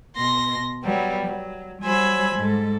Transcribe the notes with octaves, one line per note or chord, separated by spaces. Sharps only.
B2 C6 A#6
F#3 G3 B3
F#3
F#3 G3 C5 G#5 B5 E6
G#2 A4